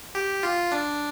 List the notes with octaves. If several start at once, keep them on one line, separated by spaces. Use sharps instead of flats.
G4
F4
D4